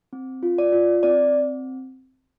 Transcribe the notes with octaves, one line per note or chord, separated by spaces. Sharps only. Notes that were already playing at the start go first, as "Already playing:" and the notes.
C4
F4
D5
F4
C4 D5